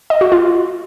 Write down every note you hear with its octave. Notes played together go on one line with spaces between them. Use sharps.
D#5
F#4
F4